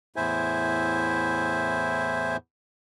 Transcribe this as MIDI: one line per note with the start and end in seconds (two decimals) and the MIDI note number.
0.16 2.37 40
0.16 2.37 45
0.16 2.37 64
0.16 2.37 72
0.16 2.37 76
0.16 2.37 80